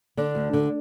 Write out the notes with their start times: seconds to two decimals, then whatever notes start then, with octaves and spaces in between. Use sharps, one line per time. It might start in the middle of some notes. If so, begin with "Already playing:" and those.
0.17 D3 D4
0.35 D2
0.53 D3